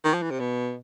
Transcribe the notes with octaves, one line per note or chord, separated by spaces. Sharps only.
D#3
F3
E3
C3
B2